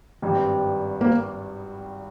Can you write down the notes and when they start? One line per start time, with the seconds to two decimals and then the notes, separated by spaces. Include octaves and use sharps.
0.22 G#1 G2 G3 C4
1.01 A#3